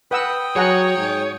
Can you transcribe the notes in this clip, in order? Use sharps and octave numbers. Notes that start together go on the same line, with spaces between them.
B4 F#5 G5 D#6 E6
F#3 G#4 C#5 F#5 A#5
G#2